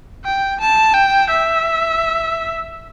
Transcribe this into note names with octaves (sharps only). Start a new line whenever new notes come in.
G5
A5
G5
E5